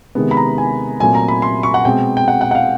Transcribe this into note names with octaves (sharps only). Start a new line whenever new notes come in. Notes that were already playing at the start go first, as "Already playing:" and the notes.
C3 D#3 G#3 B3
B5
A#5
G#5
A#2 F#3 A3 C4 G#5
A#5
B5
C6
C#6
F#5
B2 G#3 C4 G5
G5
F#5
F#5
F#5
F5